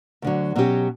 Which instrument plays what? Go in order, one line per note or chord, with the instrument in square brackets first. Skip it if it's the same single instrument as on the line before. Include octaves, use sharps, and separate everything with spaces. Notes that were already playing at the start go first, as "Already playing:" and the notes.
[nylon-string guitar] D2 D3 F#3
B2 F#3 C#4 G4